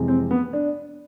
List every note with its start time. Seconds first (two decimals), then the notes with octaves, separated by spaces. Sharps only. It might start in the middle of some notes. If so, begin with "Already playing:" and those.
Already playing: F2 C3 E3 G#3
0.08 C4
0.31 B3
0.53 D4